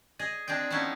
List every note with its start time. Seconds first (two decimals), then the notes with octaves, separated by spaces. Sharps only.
0.19 G#4 D#5
0.48 C4 D4 G#4 D#5 G5
0.70 F3 B3 C#4 D#4 E4